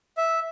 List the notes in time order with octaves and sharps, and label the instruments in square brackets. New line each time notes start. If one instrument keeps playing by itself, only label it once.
[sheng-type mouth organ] E5